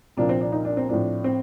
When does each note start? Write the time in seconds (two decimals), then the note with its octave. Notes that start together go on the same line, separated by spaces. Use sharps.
0.17 C2 A#2 F3 A#3 D4
0.29 C4
0.41 D4
0.52 D#4
0.65 D4
0.77 C4
0.89 A2 F3 C4 D4
1.24 C4